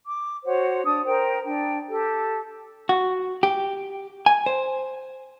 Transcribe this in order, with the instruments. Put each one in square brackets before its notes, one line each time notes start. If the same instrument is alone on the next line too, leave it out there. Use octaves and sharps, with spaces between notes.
[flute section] D6
F#4 C5 C#5 F#5
D4 D#6
A#4 C5 G5
D4 G5
G4 A4
[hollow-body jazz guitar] F#4
G4
G#5
C5